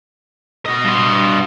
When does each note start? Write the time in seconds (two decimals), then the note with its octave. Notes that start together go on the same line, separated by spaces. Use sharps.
0.66 F#4 D#5
0.85 G2 C6